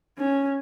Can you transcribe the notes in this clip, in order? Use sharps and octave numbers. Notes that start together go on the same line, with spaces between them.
C#4